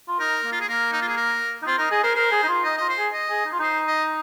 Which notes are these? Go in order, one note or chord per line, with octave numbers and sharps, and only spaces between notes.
F4
D#4 A#4
A#3
F4
G#4
A#3 A#4
D#4
F4
G#4
A#4
D#4
C4 F4
D#4 A#4
G#4 D#5
A#4 C5
A#4 C5
G#4
D#4
F4
D#4 D#5
F4 D#5
C5
G#4
D#5
G#4
D#4
F4
D#4 C5
D#5